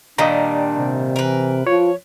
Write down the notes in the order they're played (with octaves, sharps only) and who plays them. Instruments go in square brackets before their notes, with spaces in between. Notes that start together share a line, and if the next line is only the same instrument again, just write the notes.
[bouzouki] A#2 D#3 G3 [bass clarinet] D4 [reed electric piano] D#5 A#5
[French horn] C3
[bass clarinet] E3 [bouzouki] A#4 B4
[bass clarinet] F3 [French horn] F4 [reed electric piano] C#5